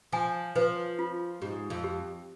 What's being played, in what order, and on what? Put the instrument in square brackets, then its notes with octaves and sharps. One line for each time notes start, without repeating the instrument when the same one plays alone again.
[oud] F3 [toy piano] G#5
[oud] F3 [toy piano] B4
[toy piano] F4
[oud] G#2 [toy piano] G4
[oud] F2
[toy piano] G4